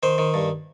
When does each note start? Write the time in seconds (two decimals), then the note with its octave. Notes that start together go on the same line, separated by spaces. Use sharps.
0.03 D#3 C5
0.18 D#3
0.34 G2